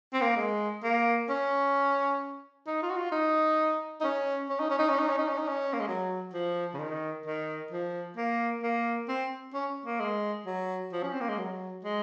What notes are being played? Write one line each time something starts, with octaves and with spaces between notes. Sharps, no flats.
C4
A#3
G#3
A#3
C#4
D#4
F4
F#4
F4
D#4
D#4
C#4
C#4
D#4
C#4
D#4
C#4
D#4
C#4
D#4
C#4
D#4
C#4
A#3
G#3
F#3
F3
C#3
D#3
D#3
F3
A#3
A#3
C4
C#4
A#3
G#3
F#3
F3
C#4
C4
A#3
G#3
F#3
G#3